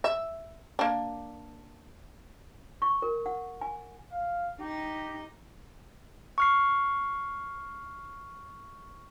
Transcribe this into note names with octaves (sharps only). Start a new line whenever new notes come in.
E5
A#3 D4
C#6
A#4
F#5
G#5
F5
D#4 G4
C#6 F6 C7